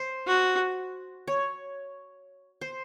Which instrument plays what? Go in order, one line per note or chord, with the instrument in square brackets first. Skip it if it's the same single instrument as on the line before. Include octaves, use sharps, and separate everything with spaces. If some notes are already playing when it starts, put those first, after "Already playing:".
Already playing: [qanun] C5
[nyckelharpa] F#4
[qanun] C#5
C5